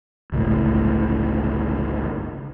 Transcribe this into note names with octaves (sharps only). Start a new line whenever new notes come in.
G1 C#2 A2